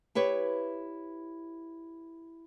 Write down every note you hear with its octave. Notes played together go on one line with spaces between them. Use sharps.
E4 G4 B4 C#5